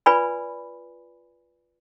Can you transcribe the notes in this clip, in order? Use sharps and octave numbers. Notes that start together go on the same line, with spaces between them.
F4 B4 D5 G#5 B5